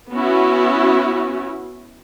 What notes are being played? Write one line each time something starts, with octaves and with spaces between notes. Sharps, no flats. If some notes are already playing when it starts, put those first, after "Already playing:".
B3 C#4 E4 F#4